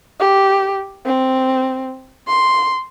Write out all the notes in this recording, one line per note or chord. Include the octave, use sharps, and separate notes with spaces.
G4
C4
C6